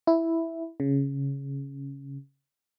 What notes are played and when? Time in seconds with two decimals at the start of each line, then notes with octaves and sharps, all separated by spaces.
0.07 E4
0.80 C#3